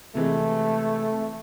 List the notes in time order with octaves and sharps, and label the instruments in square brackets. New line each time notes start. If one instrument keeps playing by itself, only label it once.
[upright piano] C3 E3 G#3 [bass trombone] A3